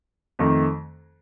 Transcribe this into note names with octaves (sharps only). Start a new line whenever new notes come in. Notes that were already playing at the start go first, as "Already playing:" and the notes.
F2 D#3 A3